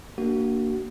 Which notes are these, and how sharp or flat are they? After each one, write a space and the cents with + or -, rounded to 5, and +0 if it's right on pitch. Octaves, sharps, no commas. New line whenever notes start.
A#3 -5 D4 +0 F#4 +25